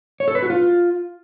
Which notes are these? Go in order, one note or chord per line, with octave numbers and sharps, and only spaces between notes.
C#5
A4
B4
F#4
F4